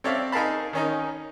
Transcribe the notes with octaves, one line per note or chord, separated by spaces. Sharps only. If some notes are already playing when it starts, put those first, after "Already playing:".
C4 A4 C#5 D5 E5 F5
D#4 G#4 A#4 F5 A5 B5
D#3 C#4 D#4